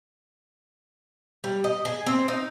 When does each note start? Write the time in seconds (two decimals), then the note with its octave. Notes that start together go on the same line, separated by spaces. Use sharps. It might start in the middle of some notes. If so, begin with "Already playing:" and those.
1.44 G3
1.64 D#5
1.85 G#4
2.06 C4
2.28 D#4